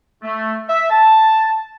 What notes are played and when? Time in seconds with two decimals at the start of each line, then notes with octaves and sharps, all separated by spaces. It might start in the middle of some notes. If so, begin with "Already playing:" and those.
0.23 A3
0.68 E5
0.91 A5